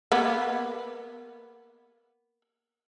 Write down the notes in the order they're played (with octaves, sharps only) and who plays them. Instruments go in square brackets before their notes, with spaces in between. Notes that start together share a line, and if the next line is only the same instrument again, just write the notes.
[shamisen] A#3 B3